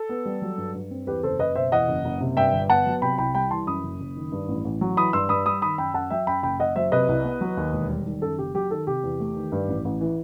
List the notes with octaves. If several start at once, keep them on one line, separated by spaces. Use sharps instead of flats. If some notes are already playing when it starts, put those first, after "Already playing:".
Already playing: A4
B3
G3
F#3
G2
G2
C4
E2 G4 B4
F#1 A4 C5
F#1 B4 D#5
B2 C5 E5
E2 D#5 F#5
F#1
F#1
C3
G2 E5 G5
G1
B3 F#5 A5
F#3
C3 G5 B5
C2 G5 B5
G3 G5 B5
E3 A5 C6
F#2 B5 D#6
F#1
F#1
D#3
G2
A1
A1
F#3
E3 B5 D#6
G2 C6 E6
G2 B5 D#6
G3 B5 D#6
D#3 B5 D#6
F#2 G5 B5
F#2 F#5 A5
F#3 E5 G5
F#2 G5 B5
F#1 G5 B5
F#1 D#5 F#5
F#3 C5 E5
C3 B4 D#5
C2
B3
F#3
D#2
E1
G3
D#3
F#2 A4
F#1 G4
F#3 G4
D#3 A4
C3 G4
E2
A3
D#3
G2
A1
A1
E3